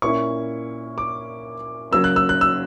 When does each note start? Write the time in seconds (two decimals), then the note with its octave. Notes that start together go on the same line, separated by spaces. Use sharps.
0.02 A#2 A#3 C#4 E4 C#6
0.98 D6
1.91 C#3 F#3 A#3 C#4 E6
2.04 F#6
2.16 E6
2.29 F#6
2.41 E6